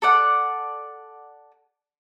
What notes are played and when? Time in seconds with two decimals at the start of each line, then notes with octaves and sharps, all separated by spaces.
0.02 A4 D5 F#5